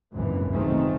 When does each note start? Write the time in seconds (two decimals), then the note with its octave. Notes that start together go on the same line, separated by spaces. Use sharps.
0.13 G#1 C#2 F#2 A#2 E3
0.52 C3 D#3 F3 G#3 A3 C4